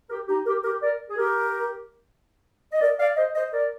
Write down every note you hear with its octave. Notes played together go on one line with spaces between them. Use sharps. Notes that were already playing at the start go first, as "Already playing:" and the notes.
G4 A#4
D#4 G4
G4 A#4
G4 A#4
A#4 D5
G#4
G4 A#4
D#5
A#4 D5
D5 F5
C5 D#5
C5 D#5
A#4 D5